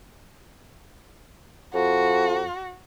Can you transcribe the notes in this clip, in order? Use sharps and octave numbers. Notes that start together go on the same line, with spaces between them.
F2 F#4